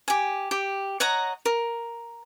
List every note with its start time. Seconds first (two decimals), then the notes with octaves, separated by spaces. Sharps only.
0.08 G4 G#5
0.51 G4
1.00 C#5 D#5 F#5 A#5
1.45 A#4